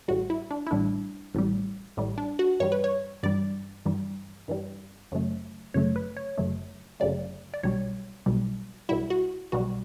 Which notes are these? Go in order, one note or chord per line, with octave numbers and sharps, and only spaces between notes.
A1 A2 G3 F#4
E4
D4
E4
A1 A2 G3 D4
A1 A2 G3
A1 A2 G3
D4
F#4
G2 E3 G3 C#5
B4
C#5
G2 E3 G3 D5
G2 E3 G3
G2 E3 G3
G1 F#2 C#3 F#3 A3
G1 F#2 C#3 F#3 A3 C#5
B4
C#5
G1 F#2 C#3 F#3 A3
G1 F#2 C#3 F#3 A3 D5
D5
B1 B2 G3 C#5
B1 B2 G3
B1 B2 G3 E4
F#4
B1 B2 G3 F#4